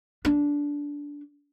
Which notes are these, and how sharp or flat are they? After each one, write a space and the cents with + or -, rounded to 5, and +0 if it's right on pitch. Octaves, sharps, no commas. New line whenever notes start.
D4 -15